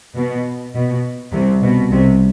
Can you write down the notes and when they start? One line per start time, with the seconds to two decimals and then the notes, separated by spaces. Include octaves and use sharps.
0.16 B2
0.75 B2
1.32 C2 C3
1.62 B2
1.91 C2 C3